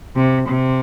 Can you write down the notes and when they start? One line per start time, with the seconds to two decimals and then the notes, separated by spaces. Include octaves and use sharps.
0.16 C3
0.48 C3